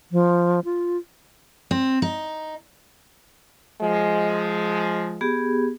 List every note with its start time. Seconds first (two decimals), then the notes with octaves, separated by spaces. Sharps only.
0.12 F3
0.65 F4
1.71 C4
2.02 D#4
3.82 F3 G#3
5.21 B3 G4 G#4